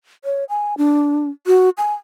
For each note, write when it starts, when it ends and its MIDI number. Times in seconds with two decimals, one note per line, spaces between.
0.25 0.44 73
0.49 0.74 80
0.78 1.29 62
1.47 1.70 66
1.78 1.93 80